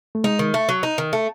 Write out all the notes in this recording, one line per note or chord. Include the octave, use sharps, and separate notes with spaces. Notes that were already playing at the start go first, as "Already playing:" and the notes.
A3
G#3 D#4
D#3
A3
F#3
D#4
D#3
A3